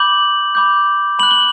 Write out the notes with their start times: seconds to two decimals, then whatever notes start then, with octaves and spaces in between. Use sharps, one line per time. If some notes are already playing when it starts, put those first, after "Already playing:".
Already playing: B5 D6 G6 F#7
0.55 B5 D6 G6
1.19 B5 F#6 F#7
1.31 G7